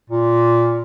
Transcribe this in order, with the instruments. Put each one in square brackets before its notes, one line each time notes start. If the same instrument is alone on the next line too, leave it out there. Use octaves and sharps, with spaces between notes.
[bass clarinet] A#2